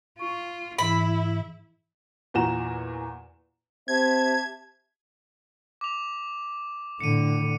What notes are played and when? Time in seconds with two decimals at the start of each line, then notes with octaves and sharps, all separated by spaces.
0.19 F4 C#6
0.78 G#2 E3 E4 B5
2.34 E2 A#2 F#4 A#5 E7
3.88 C4 G4 E5 A5 G#6
5.81 D6 F7
7.00 A2 D3 C#7 D#7